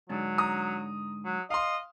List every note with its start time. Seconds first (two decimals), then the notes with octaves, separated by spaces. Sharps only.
0.09 G#2 D3 F#3 D4
0.38 A#5 D#6
1.25 F#3
1.50 D#5 F5 C6